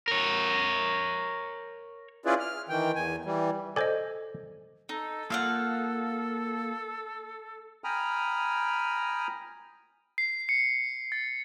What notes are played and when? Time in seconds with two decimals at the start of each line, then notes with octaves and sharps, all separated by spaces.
0.08 A#4 C#5
2.26 C#4 E4 F4 G#4 B4 D5
2.40 F6
2.69 D#3 E3 G5
2.95 E2 G#5
3.25 E3 G3
3.76 A4 C5 D5 D#5 G#5
4.89 D#4 A4
5.30 A#3 F4 F5 F#5 E6
7.84 G5 G#5 A#5 B5 D#6 F6
10.18 C7
10.49 C#7
11.12 A6